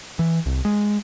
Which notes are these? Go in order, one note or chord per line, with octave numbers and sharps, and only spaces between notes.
E3
C2
G#3